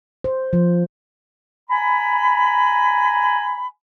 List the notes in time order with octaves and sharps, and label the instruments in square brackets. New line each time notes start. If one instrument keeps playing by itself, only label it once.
[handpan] C5
F3
[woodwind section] G#5 A#5 B5